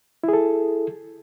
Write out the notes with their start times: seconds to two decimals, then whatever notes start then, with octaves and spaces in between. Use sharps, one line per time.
0.24 E4
0.28 G#4
0.33 A4